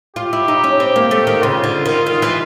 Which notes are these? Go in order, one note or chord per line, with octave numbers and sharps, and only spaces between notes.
F4 G4
E4
D#4
C#4
C4
A#3
A3
D#3
C#3 F4
D3
D#3
D#3
E3